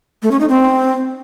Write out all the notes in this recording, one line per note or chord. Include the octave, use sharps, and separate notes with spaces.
A3
C#4
D#4
C4